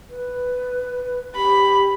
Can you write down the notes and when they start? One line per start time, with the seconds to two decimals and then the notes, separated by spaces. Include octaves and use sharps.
0.10 B4
1.36 G4 B5